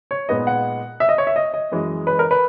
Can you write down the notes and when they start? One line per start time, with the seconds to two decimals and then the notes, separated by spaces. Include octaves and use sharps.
0.11 C#5
0.29 A#2 G#3 B3 D#4 D#5
0.47 F#5
1.00 E5
1.09 D#5
1.18 C#5
1.27 E5
1.36 D#5
1.54 D#5
1.72 F#2 E3 G#3
2.07 B4
2.19 A#4
2.31 B4